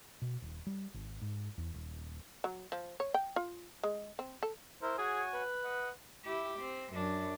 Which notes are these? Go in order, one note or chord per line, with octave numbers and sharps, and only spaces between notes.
B2
D#1
G3
G#1
G#2
E2
D#1
F#3
F3
C#5
G5
F4
G#3
C4
A4
E4 A#4 C5
F#4 G#4 C#5 G#5
B4
D#5 F#5
E4 G4
C4
F#2 D4